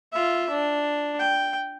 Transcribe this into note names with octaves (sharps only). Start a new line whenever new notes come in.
F4 E5
D4
G5